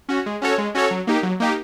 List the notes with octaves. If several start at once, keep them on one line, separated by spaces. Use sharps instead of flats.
C#4 F#4
G#3
C#4 F#4 A4 C#5
G#3
C#4 F#4 A4 C#5
F#3
A#3 D#4 G4
F#3
A#3 D#4 G4